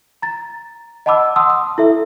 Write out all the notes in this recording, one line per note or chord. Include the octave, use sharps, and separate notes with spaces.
A#5 A6
D#5 F#5 A5 B5 D6 E6
F#5 A5 C6 D#6 E6
D#6
E4 A4 E5